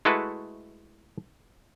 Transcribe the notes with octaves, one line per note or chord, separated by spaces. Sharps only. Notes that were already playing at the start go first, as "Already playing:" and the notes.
G#3 A3 E4 F#4 A4 B4